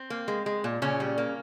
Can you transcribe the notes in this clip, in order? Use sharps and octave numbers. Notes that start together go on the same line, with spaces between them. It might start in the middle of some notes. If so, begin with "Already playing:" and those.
Already playing: C4
A#3
G#3
G#3
A#2
A#2 C#3 C#4
G3
A#3